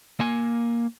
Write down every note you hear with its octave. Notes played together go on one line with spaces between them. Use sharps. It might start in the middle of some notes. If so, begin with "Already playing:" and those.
A#3 G#5